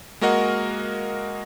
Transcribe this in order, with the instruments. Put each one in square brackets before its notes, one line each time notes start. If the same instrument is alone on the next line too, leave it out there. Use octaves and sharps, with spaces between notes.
[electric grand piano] G#3 A#3 F#4 A#4 D#5 F#5